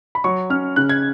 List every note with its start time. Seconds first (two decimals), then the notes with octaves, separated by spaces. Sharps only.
0.15 B5
0.24 F#3 C#6
0.50 C#4 F6
0.76 C#3 F#6
0.89 G#6